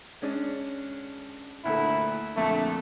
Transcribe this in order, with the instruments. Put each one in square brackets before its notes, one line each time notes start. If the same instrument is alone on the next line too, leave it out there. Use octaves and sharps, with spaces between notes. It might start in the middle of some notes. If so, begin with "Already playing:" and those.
[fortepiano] G#3 C#4 D4
[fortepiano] D2 A#2 A3 [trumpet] E4
[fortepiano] F2 A#2 D3 [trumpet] A3